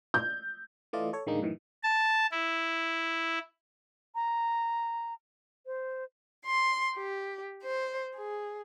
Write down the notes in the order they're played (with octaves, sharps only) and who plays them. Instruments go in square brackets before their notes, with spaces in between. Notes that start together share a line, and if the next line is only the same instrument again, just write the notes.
[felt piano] G6
[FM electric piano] E3 A3 F4 D5 D#5
A4 C#5
A1 D3 D#3 G#3 A#3 D#4
F#2 A2 D#3 E3
[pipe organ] A5
E4
[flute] A#5
C5
[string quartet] C6
G4
C5
G#4